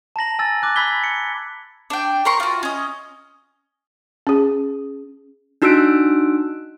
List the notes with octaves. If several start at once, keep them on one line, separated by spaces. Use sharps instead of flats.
A5 A#5 A#6 F#7
G#5 E6 A6
D6 F#6 A6
B5 E6 G#6 B6 G7
C#7
D4 G5
A#4 A#5 C6 C#6
F4 F#4
C#4 D#5
C#4 G#4
D4 D#4 F#4 E6 F#6 D7